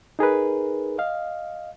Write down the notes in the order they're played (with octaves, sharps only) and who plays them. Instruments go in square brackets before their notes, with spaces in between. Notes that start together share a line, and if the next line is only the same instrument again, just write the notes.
[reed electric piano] D#4 G#4 A#4 B4
D#5 F5